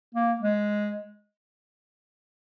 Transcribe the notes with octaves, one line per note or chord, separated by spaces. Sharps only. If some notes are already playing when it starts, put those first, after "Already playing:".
A#3
G#3